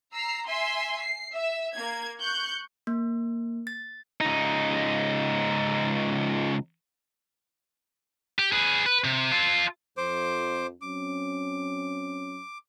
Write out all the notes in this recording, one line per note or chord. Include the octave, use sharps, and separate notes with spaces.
A#5 E6 C7
E5 G#5 C6
C7
E5
A#3 G#6
C#6 F#6 G6
A#3
A6
C#2 D#4
G4
G#4 B4
B4
C3
F4 A4
F2 C5 D6
F#3 C4 C#4 D6